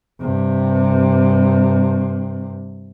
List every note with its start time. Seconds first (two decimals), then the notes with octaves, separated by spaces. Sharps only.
0.21 G2 C3